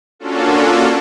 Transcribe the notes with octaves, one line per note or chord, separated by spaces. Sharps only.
A#3 C#4 D4 F4 F#4 A4